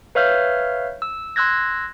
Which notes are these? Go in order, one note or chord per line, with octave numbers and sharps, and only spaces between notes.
B4 C#5 E5 F5 F6 G6
E6
C6 E6 F#6 G#6 A#6